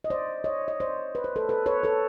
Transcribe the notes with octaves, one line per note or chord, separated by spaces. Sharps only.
D#5
C5 D5
C#5 D#5
D#5
C5 D5
B4
C5
A4 B4
A4 B4
B4 C#5
A4 B4